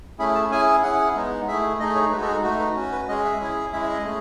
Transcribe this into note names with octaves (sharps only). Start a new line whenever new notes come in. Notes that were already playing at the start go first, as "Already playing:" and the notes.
A3 C#4 E4 G#4 B5
A5
C#4 E4 G#4 G#5
C#4 E4 G#4 F#5
G#3 B3 D#4
A3 E4 G#4 E5
A3 D#4 G#4 D#5
C#5
G#3 D#4 F#4 B4
A4
G#4
A3 D#4 F#4
B4
C#4 F#4
B4
G#3 C#4 G#4 D#5
E5
C#4 E4 G#4
G#3 C#4 E4 G#4 E5
E5
D#5
A3 C#4 G#4